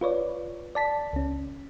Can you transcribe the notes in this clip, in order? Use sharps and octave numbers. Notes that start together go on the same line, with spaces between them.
F4 B4 C#5 D5
D5 A5 B6
C#2 C#4